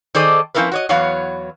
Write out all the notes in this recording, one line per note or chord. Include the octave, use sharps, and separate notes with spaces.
D#3 G#4 A4 C5 D5 D#5
F3 C4 C#4 E4 A#4 B4
F#4 C#5 D#5
E2 F#3 B3 C#5 F5